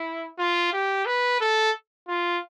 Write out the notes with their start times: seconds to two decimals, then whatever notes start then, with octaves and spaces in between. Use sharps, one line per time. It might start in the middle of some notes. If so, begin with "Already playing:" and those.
Already playing: E4
0.39 F4
0.73 G4
1.06 B4
1.40 A4
2.08 F4